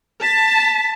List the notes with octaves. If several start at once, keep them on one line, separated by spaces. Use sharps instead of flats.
A5 B6